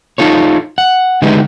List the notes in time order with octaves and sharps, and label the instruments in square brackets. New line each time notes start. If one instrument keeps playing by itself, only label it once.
[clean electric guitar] D#4 F4 A4 C#5
F#5
D3 G#3 D#4 G4 B4